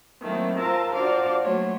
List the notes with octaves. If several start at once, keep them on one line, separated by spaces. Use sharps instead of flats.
D#3 F#3 A3 A#3 C4 E4
F4 A#4 C5 A5 A#5 E6
D4 F4 F#4 C5 D5 F5
F#3 A3 A#3 F#4 C#5 C6